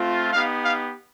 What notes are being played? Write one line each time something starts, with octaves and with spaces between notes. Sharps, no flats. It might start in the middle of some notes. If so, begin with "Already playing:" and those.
Already playing: A3 C4 F4
B3 D#4 G4 F5
F5